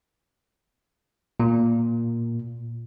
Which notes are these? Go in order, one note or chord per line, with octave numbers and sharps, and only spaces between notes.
A#2